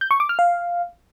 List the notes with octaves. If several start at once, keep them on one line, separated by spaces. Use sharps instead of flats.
G6
C#6
D6
F6
F5